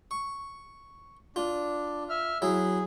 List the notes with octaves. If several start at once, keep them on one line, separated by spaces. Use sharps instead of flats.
C#6
D4 F4
E5 F6
F#3 E4 G#4